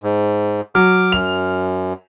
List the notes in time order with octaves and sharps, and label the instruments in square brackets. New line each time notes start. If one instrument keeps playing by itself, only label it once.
[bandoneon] G#2
[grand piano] F#3 [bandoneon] D6 [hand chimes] F6
[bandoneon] F#2 [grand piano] F7